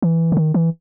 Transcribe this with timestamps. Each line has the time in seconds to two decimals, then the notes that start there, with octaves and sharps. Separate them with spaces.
0.02 E3
0.32 D3
0.37 D#3
0.54 E3